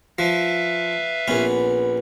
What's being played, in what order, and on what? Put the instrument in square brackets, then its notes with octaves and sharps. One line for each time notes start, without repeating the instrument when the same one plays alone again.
[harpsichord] F3 [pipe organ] B4 E5 F5
[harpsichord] A#1 C#4 [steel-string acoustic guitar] B3